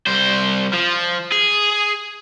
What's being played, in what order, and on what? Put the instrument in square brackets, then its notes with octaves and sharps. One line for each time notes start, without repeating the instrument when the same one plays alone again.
[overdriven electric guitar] C2 C5
F3
G#4